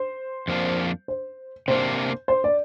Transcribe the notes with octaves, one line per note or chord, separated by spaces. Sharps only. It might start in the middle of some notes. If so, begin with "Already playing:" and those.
Already playing: C5
F2 F3 A#3 D4
C5
C3 A#3 D4 C5
C5
D5